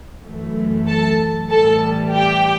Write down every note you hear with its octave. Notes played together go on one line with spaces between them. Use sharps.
F#2 E3 A3
A4 A5
A2 E3 G3 A4 A5
G4 G5